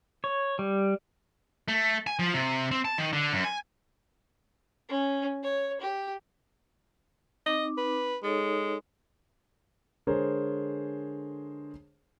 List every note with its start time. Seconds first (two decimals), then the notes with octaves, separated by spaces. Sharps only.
0.24 C#5
0.59 G3
1.68 A3
2.07 G#5
2.19 F3
2.34 C3
2.71 C4
2.85 A5
2.98 D#3
3.13 D3
3.33 F#2
3.44 G#5
4.89 C#4
5.43 C#5
5.81 G4
7.46 C4 D#4 D#5 D6
7.78 B4
8.23 G#3 D#4 A4 C#5
10.07 D3 G#3 G#4 A#4 C5 C#5